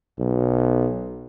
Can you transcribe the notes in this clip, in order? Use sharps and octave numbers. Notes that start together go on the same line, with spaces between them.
B1